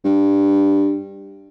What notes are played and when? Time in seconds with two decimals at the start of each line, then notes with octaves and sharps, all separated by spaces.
0.04 G2